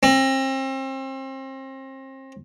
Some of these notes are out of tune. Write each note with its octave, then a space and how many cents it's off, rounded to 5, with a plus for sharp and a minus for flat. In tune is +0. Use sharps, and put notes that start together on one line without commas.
C4 +35